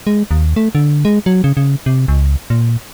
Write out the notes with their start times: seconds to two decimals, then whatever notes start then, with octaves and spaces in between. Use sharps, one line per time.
0.07 G#3
0.31 D#2
0.56 A3
0.75 D3
1.05 G#3
1.26 F#3
1.44 C#3
1.57 C#3
1.86 C3
2.08 C#2
2.50 A#2